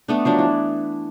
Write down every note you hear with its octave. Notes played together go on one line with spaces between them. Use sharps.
A3 B3 D4
F3 F#3 D4
E3